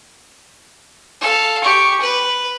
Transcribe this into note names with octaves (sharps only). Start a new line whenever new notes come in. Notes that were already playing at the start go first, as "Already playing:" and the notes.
A4 F5
G4 C#6
B4